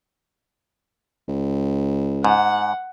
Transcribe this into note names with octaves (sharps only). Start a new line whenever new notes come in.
C#2
G#2 F#5